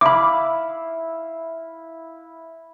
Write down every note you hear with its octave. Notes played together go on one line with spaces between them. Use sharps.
E4 F5 B5 D6